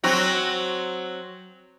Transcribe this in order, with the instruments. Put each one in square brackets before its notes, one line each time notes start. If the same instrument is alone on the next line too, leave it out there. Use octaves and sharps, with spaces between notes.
[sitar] F#3 C4 F#4